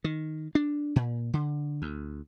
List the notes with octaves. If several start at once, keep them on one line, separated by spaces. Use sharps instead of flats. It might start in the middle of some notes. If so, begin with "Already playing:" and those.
D#3
D4
A#2
D3
D2